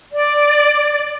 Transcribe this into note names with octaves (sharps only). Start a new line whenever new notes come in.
D5